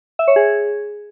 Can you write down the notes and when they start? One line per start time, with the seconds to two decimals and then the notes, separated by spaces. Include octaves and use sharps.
0.19 E5
0.28 C#5
0.36 G#4